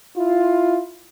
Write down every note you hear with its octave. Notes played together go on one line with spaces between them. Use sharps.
E4 F4